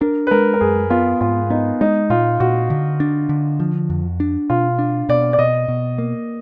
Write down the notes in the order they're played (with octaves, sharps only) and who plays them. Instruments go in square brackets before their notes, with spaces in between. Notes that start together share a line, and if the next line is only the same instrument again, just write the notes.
[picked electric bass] D4 [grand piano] A#4
[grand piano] B4
[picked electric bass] G#3 [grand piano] A#4
[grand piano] A#4
[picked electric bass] F#2 [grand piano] G#4
[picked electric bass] B3 [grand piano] F4
[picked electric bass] G#2 [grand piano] F4
[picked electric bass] B3 [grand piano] D#4
[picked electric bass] G#3 [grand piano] D#4
[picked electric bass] A#2 [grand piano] F4
[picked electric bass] A#2 [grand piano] F#4
[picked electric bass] D3
D4
D3
F3
F2
D4
[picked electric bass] B2 [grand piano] F4
[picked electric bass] D4
[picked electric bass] B2 [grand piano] D5
[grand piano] D5
[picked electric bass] B2 [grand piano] D#5
[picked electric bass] B2
A#3